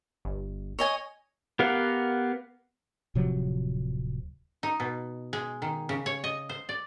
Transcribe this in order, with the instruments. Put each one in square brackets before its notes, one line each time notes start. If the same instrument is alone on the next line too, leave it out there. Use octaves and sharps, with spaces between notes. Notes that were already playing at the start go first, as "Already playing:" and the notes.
[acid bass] G1
[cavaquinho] C#5 D#5 G#5
[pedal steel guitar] B3 G4 A#4 F5 F#5
[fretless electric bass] D1 C3 F3 F#3
[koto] D#4
B2
G#3
D#3
C#3
C#5
D#5
C5
D5